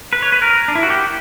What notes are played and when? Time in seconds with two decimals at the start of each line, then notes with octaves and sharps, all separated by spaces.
0.13 B4
0.22 C#5
0.32 B4
0.42 A#4
0.68 D4
0.75 E4
0.83 F#4
0.90 G4